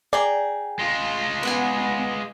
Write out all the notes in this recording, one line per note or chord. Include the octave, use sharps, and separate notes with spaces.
G#4 D5 G5 A#5
G#3 F4
B3 B4 F#5 G#5